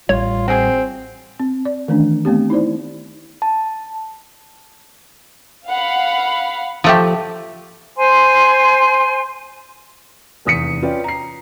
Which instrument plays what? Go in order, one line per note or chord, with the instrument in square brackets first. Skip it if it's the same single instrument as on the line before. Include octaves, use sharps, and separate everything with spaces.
[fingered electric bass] A1 G3 [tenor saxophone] F4 [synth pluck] C#5
[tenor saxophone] C4 [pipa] F#4 G#4
[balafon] C4
D5
D#3 E3 A3 C#4 D4
A3 B3 C4 G4
D#4 E4 C5 D5
[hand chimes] A5
[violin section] F5 F#5 B5
[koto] F3 A3 G4
[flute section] C5 G#5 C6
[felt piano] F1 E2 D#6 B6 C#7 D#7
C#4 F4 B4 D5 G5
A#5 C7